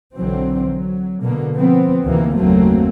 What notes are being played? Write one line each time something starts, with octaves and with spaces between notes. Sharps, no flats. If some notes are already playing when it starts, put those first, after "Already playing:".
B1 D3 E3 F#3 C4
F#3
B2 D3 A#3
F3 B3 C4
D2 C3 D#3 E3 A#3
F#1 D#2 F#3 A3 A#3 C4